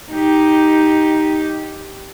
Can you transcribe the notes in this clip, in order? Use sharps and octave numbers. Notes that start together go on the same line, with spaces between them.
D#4 G4